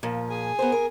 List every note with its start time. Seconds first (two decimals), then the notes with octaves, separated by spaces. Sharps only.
0.03 A#2 F3
0.30 G#4 G#5
0.59 B3 A#4 C5
0.72 A#4